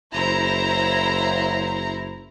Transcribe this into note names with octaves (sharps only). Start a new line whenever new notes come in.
F#1 E4 C5 A#5